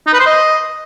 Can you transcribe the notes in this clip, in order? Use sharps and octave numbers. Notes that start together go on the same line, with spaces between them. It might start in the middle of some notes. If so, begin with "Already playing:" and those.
D#4
B4
C5
D#5